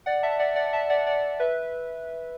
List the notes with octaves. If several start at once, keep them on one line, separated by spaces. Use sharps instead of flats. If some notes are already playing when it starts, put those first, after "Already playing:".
D5 F#5
E5 A5
D5 F#5
D5 F#5
E5 A5
D5 F#5
D5 F#5
B4 E5